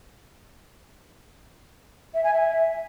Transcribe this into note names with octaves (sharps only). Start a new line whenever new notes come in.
E5
G#5
E5